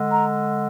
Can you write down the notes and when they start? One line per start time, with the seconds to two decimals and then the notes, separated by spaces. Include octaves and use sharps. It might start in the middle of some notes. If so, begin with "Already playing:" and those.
Already playing: D3 G#3
0.12 A#5